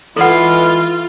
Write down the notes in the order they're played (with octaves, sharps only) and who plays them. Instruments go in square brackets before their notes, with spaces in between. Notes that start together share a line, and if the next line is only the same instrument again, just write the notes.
[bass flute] E3 [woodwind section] G#3 E4 [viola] F4 [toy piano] A4 F#5